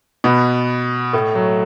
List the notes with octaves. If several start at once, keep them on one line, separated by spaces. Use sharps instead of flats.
B2 B3
A2 A3
F#3